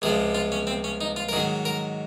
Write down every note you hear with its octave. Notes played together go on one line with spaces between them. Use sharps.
C#2 C3 F3 G#3 G#4
F4
C#4
C4
C#4
D#4
F4
A#4
G#2 D#3 F#3 G#4
A#4